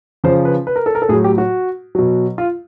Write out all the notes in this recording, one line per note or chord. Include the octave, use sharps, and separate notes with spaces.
C#3 F3 C5
B4
B4
A#4
A4
A#4
A4
A2 F#3 G#4
G4
F#4
B2 F#3
F4